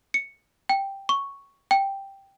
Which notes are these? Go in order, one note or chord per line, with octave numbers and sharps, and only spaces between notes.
C#7
G5
C#6
G5